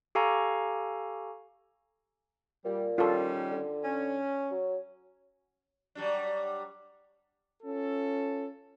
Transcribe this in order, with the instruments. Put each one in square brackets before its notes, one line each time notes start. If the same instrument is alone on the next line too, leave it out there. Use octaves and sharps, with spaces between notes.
[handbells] G4 A4 F5 G#5 A#5 C#6
[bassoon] A#2 [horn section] G3
[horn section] D#3 G3 C#4 [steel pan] F4 A4
[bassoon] D3
[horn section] C#4
[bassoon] F#3
[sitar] F#3 G3 D4
[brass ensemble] C#4 F4 A4